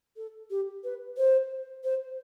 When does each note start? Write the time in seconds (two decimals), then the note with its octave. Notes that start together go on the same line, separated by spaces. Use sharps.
0.16 A4
0.50 G4
0.84 B4
1.17 C5
1.84 C5